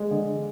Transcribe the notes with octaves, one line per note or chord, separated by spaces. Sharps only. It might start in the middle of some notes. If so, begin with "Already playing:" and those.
Already playing: G#3
D3